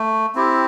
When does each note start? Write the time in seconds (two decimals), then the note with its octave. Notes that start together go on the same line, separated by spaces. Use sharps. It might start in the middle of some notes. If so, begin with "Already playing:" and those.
Already playing: A3
0.35 C4 E4 G4